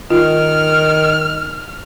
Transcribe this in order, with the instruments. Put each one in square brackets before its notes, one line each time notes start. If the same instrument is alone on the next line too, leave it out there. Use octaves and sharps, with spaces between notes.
[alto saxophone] D#3 [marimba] F4 [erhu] F6